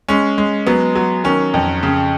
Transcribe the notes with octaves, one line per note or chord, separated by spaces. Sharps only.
G#3 C#4
G#3
F#3 B3
F#3
D#3 C#4
F2
C#3